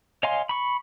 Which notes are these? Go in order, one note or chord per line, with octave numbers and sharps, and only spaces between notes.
C#5 D#5 F5 G#5 C6
B5 C#6